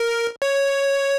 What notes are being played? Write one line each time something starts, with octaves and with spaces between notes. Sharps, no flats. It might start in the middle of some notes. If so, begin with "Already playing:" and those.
Already playing: A#4
C#5